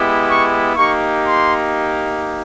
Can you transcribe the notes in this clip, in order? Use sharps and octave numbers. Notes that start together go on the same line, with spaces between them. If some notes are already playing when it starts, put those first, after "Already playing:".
Already playing: G#3 B3 E4 G4
C#6
A#3 D#4 G4 C#6
C6